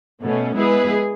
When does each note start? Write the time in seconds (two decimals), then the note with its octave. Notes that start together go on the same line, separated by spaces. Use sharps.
0.23 B2 A3 C#4
0.56 G#3 B3 E4 G#4 B4